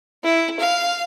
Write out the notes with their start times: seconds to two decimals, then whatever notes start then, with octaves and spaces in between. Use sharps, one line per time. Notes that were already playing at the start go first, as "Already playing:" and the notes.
0.24 E4
0.60 F5